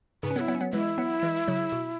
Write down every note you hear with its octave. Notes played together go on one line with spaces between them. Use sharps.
G#2 C#3 B4
C#4
F#3 B3
E4
F#3 B3
C#4
F#3 B3
E3 G#3 E4
F#3 B3
E3 G#3
C#3 F#3
B2